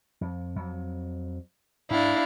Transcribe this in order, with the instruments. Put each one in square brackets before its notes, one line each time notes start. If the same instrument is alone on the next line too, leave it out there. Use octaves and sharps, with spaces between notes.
[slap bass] F2
F2 F#3
[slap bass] G#2 [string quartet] D4 E4 F5